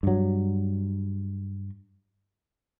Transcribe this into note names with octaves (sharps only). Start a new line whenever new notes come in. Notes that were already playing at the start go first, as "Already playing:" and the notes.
G2 F#3